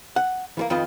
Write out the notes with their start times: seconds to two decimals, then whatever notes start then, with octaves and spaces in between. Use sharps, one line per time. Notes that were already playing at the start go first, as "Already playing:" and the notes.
0.16 F#5
0.57 E3 G3 A#3
0.70 F2 D#3 F4 B4 D#5